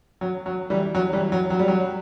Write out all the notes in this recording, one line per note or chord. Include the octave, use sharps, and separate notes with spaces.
F#3
F#3
E3 G3
F#3
E3 G3
F#3
F#3
G3
F#3